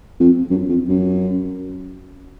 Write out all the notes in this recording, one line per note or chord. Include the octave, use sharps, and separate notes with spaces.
F2
F#2
F2
F#2